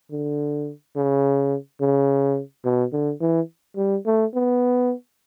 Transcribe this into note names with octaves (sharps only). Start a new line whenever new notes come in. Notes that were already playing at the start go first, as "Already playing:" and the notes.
D3
C#3
C#3
B2
D3
E3
G3
A3
B3